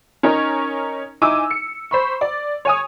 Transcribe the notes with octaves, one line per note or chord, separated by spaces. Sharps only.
C#4 D#4 A#4 C#5
D#4 E4 G#5 D6 E6
C#7
C5 B5 C#6
D5
C#5 G#5 D#6